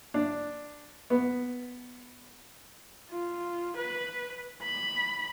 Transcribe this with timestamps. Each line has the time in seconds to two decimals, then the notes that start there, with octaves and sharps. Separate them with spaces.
0.14 D4
1.10 B3
3.10 F4
3.77 B4
4.63 B5